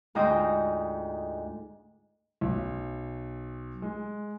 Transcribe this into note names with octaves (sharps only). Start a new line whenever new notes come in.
D2 G#2 F4 D#5 G5 D#6
B1
G#3